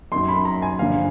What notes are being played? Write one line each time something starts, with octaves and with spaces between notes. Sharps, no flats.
F#2 D#3 F#3 C6
B5
A#5
G#5
G2 D3 F3 F5